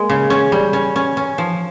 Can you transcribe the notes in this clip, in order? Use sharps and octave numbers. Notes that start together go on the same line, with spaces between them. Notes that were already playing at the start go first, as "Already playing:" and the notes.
Already playing: G#3 A#3
C#3
C#4
G3
C#4
C#4
C#4
F3